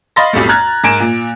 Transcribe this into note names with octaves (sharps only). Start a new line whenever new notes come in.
D#5 F5 B5 C6 A6 A#6
B1 F2 A2 G3 A3
A#5 F6 F#6 G#6 A6
G#2 A#4 G#5 D7 E7
A#2